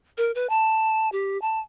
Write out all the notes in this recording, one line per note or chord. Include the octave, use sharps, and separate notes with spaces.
A#4
B4
A5
G4
A5